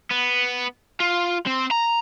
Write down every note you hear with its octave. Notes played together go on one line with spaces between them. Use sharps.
B3
F4
C4
A#5